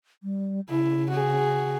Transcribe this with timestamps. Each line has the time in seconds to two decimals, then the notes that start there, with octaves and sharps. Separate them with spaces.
0.23 G3
0.69 C#3 E4
1.10 F#4 G#4